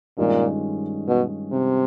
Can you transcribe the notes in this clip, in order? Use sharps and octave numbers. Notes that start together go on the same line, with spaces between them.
G2 A#2 D#3 G#3 C#4 F4
B2
C3